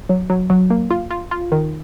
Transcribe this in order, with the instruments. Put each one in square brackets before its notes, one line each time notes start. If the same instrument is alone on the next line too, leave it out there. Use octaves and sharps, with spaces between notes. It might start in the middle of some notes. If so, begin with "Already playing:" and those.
[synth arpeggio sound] F#3
F#3
F#3
A#3
F4
F4
F4
D#3